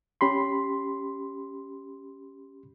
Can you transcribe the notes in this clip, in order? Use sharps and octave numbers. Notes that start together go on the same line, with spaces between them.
C#4 G4 B5 C6